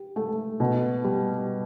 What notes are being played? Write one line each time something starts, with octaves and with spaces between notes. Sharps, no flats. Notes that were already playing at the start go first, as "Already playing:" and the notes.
Already playing: G4
A3
B2
G3